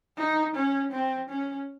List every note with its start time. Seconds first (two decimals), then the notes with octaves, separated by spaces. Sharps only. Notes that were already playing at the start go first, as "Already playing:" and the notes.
0.18 D#4
0.56 C#4
0.92 C4
1.29 C#4